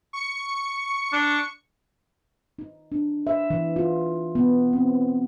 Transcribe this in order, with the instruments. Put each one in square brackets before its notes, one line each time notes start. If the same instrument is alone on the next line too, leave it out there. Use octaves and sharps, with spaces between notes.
[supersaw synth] C#6 C#7
[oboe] D4
[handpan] D#4
D4
E5
E3
F4
B3
C4